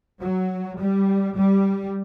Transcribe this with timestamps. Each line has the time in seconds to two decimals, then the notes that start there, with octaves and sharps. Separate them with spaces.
0.20 F#3
0.79 G3
1.35 G3